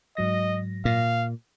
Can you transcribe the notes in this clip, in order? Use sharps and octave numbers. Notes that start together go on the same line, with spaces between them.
G#2 F#3 D#5 A#6
A#2 F5